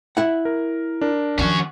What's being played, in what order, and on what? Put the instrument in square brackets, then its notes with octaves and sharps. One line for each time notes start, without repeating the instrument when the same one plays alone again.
[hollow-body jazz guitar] E4 F#5
[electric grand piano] A#4
D4 A#4
[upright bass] D#3 F3 [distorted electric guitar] C#4 F#4